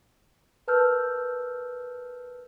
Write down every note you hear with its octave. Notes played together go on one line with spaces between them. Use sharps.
A#4 B4 A5 E6 F6 G6